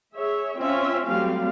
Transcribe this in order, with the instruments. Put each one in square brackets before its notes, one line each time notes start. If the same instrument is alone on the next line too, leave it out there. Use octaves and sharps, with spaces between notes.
[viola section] G#4 C#5 E5
C4 C#4 F4 E5
F#3 G3 A3 C4 F5